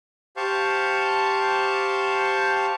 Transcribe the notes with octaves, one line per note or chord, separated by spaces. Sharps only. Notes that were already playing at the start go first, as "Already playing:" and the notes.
G4 C5 F5 A5 C#6